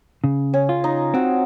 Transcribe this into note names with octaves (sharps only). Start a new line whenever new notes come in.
C#3
C#4
F4
D#4
C4 F#4